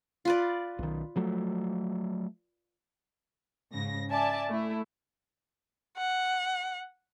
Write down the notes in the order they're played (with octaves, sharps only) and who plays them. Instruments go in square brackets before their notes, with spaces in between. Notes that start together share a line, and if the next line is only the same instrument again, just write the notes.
[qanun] F4 B4 D5
[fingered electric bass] B1 D#3
F3 F#3 A3
[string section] G#2 C#3 A#6
D5 E5 G#5 A5
A3 E4
[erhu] F#5